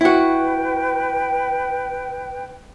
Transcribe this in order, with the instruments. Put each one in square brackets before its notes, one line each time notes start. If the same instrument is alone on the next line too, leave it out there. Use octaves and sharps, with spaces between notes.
[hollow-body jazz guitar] E4 F#4 [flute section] B4 G5